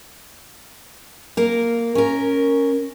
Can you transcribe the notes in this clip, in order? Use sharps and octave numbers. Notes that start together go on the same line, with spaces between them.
A#3 A#4
C#4 A#4